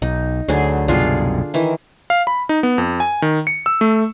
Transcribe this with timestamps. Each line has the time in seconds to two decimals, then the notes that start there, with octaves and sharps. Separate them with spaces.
0.02 B1 D#4
0.48 D2 D3 F#3 G#4
0.88 C2 F#2 B2 D4 F4 G#4
1.54 D#3 E3
2.10 F5
2.27 B5
2.49 D#4
2.63 B3
2.78 F2
3.00 G#5
3.22 D#3
3.47 C#7
3.66 E6
3.81 A3